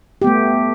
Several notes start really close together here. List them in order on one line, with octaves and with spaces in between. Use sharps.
G4 B3 A3